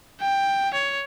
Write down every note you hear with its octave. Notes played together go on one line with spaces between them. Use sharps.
G5
C#5